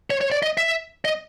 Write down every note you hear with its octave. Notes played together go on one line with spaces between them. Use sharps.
C#5
C#5
D5
D#5
E5
D#5